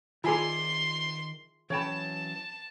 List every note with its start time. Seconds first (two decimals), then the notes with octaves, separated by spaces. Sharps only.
0.24 D#3 E4 F4 G#4 D5 G#5 A#5 C6
1.70 E3 F#3 C#4 C#5 G5 A5 B5